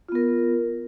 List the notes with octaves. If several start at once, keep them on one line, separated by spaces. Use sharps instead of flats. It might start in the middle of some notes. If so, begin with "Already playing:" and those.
B3 F4 A#4